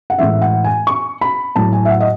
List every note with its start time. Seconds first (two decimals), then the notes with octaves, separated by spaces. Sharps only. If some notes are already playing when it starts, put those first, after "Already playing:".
0.10 F#5
0.18 A2 E3 G#3 E5
0.42 F#5
0.64 G#5
0.87 C#6
1.21 B5
1.56 A2 F#3 A5
1.73 G#5
1.85 E5
1.90 F#5
2.00 D#5